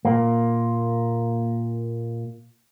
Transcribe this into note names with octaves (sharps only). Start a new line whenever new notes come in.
A#2 A#3